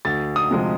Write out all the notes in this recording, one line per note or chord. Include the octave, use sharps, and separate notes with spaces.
D2 A6
D#6
C3 F3 G#3